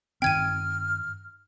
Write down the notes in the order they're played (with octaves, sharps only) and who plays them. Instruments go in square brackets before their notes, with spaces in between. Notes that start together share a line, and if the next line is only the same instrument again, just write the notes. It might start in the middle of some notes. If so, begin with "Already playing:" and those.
[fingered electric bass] G2 D#3 C4 [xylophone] G5 G#6 D#7 [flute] F6